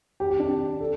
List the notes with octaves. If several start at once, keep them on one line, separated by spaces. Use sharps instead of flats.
G4
G4
D4
G4
A4